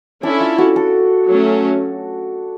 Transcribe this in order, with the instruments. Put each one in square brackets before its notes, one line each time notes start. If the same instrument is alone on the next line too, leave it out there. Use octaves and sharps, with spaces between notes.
[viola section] C#4 E4 A4 [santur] D4
[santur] F4
F#4
A4
[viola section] F#3 A3 C#4